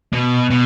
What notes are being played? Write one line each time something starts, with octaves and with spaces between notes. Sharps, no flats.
B2
B2